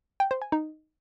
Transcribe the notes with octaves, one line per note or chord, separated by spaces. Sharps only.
G5
C5
G#5
D#4